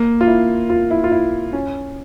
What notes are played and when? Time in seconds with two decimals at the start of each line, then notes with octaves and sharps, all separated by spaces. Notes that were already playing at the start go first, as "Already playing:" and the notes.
Already playing: A#3
0.21 F4
0.28 E4
0.70 F4
0.91 E4
1.04 F4
1.12 E4
1.53 C#4